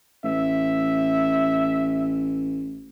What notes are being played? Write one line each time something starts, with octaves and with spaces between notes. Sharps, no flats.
A1 E5